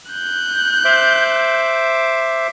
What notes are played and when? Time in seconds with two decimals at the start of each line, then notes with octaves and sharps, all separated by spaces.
0.11 F#6 G6
0.85 C5 E5 D6